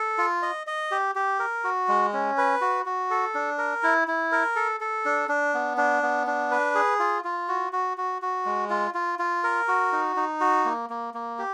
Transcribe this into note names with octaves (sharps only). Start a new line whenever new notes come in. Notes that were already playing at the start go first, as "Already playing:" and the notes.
Already playing: A4
F4
D#5
D#5
G4
G4
A#4
F#4
G#3
C#4
B4
F#4
F#4
A4
D4
A#4
E4
E4
A#4
A4
A4
D4
D4
B3
D4
B3
D4
B4
G#4
F4
F4
F#4
F#4
F#4
F#4
G#3
F4
F4
F4
A#4
F#4
D#4
D#4
F#4
A#3
A#3
A#3
G4